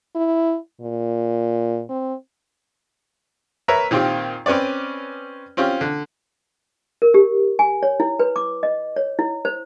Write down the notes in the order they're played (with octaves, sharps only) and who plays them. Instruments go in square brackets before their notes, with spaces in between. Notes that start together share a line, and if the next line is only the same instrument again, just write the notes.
[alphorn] E4
A#2
C4
[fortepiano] A#4 B4 C#5 E5 A#5
A#2 D#3 C4 F4 G4
C4 C#4 B4 C#5 D5
C4 C#4 F4 G4
D3
[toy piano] A#4
G4
G#5
C#5
E4
B4
D6
D#5
C#5
E4
C5